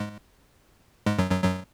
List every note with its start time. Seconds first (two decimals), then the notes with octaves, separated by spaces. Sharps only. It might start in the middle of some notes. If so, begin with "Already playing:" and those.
Already playing: G#2 G#3
1.06 G#2 G#3
1.18 F#2 F#3
1.31 F#2 F#3
1.44 F#2 F#3